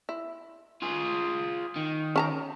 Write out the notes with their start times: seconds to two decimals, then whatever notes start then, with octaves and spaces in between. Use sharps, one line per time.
0.09 E4
0.82 F4 G#4
1.76 D#3
2.16 C#4 A5 A#5